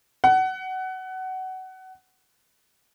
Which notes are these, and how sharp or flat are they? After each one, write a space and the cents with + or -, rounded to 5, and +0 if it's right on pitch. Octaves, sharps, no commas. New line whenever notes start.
F#5 +20